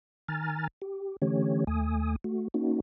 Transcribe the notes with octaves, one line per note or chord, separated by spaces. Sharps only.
D#3 G#5 A#5 F6 A6
G4
D3 E3 A3 C#4 G4 C#5
D#2 A3 G#5 D#6
A3 F#4
A#3 C#4 D#4 F#4